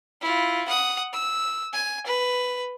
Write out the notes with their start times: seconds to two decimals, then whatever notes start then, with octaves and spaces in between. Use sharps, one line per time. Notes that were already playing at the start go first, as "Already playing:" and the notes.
0.21 E4 F4
0.68 F#5 D#6
1.13 E6
1.73 G#5
2.06 B4